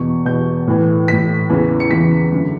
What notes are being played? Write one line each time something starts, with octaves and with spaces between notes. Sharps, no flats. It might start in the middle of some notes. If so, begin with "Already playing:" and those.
Already playing: E2 B2 C#6
E2 B2 G6
A2 E3
A2 E3 B6
E2 C#3 E3
C#7
E2 C#3 E3 B6
F#2 D3